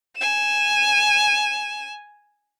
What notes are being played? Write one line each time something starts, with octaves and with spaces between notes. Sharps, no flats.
G#5 E7